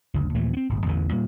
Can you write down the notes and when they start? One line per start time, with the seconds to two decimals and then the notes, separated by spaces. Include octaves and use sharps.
0.14 F#1 D2
0.35 D#2 A#2 E3 A3
0.53 B3 C4
0.69 D1 G1
0.86 A1 E2 D3 E3
1.12 A#2 G3 A#3